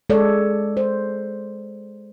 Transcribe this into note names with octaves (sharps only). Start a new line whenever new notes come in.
G#3 A4 C#5 D5
C5